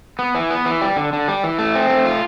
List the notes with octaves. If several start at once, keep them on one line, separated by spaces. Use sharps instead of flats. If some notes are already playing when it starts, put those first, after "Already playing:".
B3
E3
B3
E3
G3
D3
D3
G3
E3
A3
C4
A3
F4